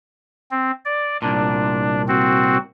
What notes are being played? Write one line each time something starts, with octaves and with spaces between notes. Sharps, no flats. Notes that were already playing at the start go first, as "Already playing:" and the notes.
C4
D5
C2 A#2 D4
C4 F#4